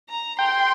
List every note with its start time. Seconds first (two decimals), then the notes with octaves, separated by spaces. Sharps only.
0.09 A#5
0.39 G5 C6